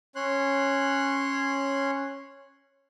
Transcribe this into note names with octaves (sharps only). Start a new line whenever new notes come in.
C#4 C#5 C6 F#6